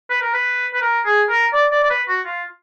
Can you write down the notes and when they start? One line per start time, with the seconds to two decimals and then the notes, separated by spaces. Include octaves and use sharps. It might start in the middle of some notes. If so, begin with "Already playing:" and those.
0.09 B4
0.21 A#4
0.34 B4
0.74 B4
0.81 A#4
1.05 G#4
1.29 A#4
1.53 D5
1.71 D5
1.83 D5
1.90 B4
2.08 F#4
2.26 F4